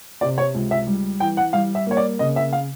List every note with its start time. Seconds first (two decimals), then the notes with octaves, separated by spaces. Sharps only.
0.21 C3 D5
0.38 C#5
0.55 C#2
0.71 E5
0.87 G3
1.20 E3 G5
1.37 F#5
1.53 G3 F5
1.75 E5
1.87 A#3 C#5
1.97 D5
2.19 C#3 D#5
2.36 E5
2.53 F5